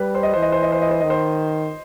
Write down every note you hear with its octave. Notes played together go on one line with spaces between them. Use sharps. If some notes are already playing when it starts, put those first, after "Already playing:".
Already playing: G3 B4
C5
D#5
E3 C5
D#5
C5
D#5
C5
D#5
C5
D#3 D#5
C5